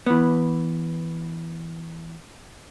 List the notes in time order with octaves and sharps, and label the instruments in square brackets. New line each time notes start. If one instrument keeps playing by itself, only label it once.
[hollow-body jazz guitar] E3 B3